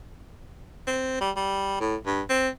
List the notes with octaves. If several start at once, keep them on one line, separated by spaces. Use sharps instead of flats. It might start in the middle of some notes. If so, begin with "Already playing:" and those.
C4
G3
G3
A2
G2
C4